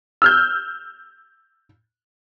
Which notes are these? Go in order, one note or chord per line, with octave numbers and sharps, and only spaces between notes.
E6 F6 G6